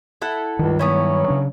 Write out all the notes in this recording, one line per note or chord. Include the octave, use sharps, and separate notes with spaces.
E4 A4 F#5
C#2 G2 D#3
F#3 B3 C#4 E4
C#3 D4